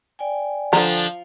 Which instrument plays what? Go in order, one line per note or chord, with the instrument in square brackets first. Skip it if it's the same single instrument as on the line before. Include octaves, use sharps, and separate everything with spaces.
[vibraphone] D5 G5 G#5
[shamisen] D3 A#5 [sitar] F3 [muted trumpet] D4